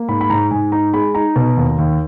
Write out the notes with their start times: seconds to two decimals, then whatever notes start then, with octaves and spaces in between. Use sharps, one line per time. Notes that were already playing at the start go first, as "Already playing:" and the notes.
Already playing: A#3
0.08 G#2 B5
0.21 B5
0.30 G#2 A#5
0.51 G#2 G#5
0.72 D#4 A#5
0.93 G#3 B5
1.15 D#4 A#5
1.36 B2
1.57 D#2
1.78 D#2